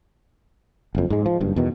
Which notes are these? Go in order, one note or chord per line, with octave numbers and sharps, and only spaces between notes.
F#1 F2
G#2 G#3
F3
F#1 G2
E2 B2 D#3